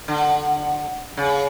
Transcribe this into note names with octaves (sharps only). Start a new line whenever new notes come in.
D3
C#3